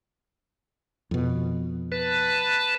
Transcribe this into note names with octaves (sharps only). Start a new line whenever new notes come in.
F2 B2
B4 A5